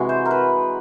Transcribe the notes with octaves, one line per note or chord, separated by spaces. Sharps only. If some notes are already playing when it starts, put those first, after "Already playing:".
Already playing: C3 E3 G#3 F#4
C5
A#4
B4